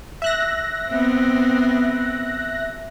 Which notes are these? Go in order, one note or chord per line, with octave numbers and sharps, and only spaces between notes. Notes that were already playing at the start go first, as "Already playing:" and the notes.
E5 F#6 A#6
B3 C4